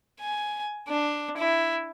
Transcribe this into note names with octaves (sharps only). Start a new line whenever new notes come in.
G#5
D4
E4